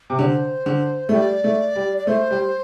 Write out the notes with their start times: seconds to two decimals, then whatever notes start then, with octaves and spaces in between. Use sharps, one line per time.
0.10 C3
0.19 D3 D5
0.23 C5
0.66 D3
1.09 A3
1.13 G3 D5
1.44 A3
1.76 G3
1.98 D5
2.07 A3 C5
2.31 G3